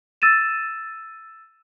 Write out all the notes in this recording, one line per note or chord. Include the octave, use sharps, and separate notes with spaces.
E6 A6 D#7 E7